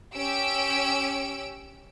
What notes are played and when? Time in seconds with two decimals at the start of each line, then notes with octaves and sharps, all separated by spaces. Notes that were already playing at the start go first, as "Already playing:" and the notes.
0.15 C#4 G4 E6 D7